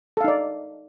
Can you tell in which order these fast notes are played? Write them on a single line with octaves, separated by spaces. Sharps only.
A4 F5 D#4 D5